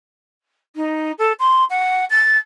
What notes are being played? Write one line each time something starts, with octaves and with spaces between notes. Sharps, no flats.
D#4
A4
C6
F#5
A6